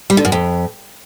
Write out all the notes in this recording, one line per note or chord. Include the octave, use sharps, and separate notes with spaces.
G3
D3
F#2
F2